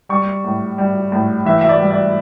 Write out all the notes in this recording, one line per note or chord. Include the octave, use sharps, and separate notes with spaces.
G3 C#6
A2
G3
A2
E3 E5
E5
D5
G3
D5